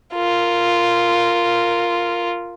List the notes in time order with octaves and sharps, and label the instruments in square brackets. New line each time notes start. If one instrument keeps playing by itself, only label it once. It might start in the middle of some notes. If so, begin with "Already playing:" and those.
[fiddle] F4 A#4